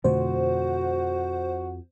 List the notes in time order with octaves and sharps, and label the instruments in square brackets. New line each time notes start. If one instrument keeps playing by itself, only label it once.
[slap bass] F2 [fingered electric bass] B2 D3 A3 [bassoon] F#4 [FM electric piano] C5